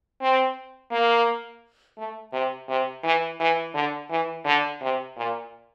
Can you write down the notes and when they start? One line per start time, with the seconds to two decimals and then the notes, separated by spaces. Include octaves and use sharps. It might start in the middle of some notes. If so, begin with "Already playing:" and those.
0.21 C4
0.92 A#3
1.98 A3
2.33 C3
2.69 C3
3.04 E3
3.40 E3
3.75 D3
4.10 E3
4.45 D3
4.81 C3
5.17 A#2